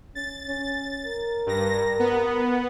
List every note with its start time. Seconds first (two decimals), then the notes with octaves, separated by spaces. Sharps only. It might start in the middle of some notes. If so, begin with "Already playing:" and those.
0.15 C#4 A6
0.48 C#4
1.05 A#4
1.46 G2 A#6
1.99 B3